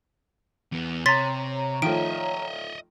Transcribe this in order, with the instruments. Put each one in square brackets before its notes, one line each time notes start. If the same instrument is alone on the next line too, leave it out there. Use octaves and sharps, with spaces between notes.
[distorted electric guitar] E2 B3
[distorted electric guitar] C3 [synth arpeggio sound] C#5 A#5 [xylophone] C6 A6 B6
[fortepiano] D#3 F3 A3 [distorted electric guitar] D#5 E5 [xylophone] D7